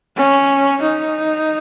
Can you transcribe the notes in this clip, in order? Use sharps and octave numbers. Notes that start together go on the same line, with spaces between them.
C#4
D#4